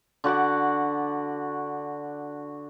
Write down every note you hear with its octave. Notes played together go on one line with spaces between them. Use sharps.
D3 F#4 F#5 D6